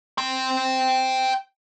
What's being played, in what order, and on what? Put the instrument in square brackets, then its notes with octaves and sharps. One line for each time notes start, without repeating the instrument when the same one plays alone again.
[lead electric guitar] G5 C6